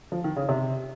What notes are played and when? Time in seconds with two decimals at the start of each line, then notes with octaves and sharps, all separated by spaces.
0.12 F3
0.24 D#3
0.36 C#3
0.49 C3